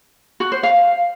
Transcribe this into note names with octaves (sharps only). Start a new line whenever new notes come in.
F#4
C5
F5